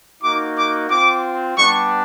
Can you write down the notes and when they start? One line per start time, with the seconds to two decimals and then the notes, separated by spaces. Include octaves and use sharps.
0.23 A#3 D#4 F#4 D6
0.57 D6
0.90 C4 F4 D6
1.56 G3 B3 D4 C#6